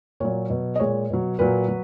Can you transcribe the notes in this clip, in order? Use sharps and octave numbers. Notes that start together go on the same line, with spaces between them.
A#2 F#3 C#5
B2 F#3
D#5
A#2 G#3 C#5
B2 F#3
A#2 F#3 B4
F#3